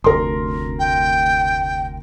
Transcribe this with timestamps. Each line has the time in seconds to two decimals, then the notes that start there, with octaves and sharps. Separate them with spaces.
0.04 F1 D2 A#4 C6
0.79 G5